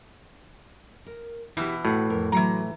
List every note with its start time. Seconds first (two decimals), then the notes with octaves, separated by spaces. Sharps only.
1.06 A#4
1.57 B2 E3 E4 G4
1.85 A2 F#4 B4 F#5
2.10 F2 A#4
2.32 E3 F#3 A3 A#5